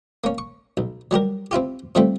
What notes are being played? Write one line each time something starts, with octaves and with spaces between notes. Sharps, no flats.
A#3 C#4
C#6
B1
F#3 G3 G4 A#4
C4 E4 F4 G4
C3 F3 G3 A3 C4